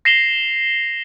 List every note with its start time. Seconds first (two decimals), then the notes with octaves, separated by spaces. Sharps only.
0.05 A#6 C7 E7 F7 G7